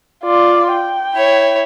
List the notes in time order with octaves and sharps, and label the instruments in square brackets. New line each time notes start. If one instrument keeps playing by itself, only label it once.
[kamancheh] F4 D5
G5
[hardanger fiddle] E4 C#5